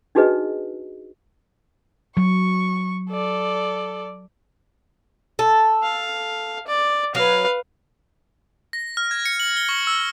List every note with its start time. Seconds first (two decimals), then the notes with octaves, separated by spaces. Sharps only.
0.15 D4 D#4 F#4 G#4 B4 D#5
2.17 F#3 C#6
3.11 A4 D5
5.39 A4
5.83 F5
6.67 D5
7.15 F#3 B4 F5
8.73 A#6
8.97 F6
9.11 G#6
9.26 C#7
9.40 F#7
9.57 G7
9.69 C#6
9.87 E6